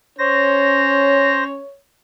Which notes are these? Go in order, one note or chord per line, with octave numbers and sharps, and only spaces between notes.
C#4 C5 C#5 A#6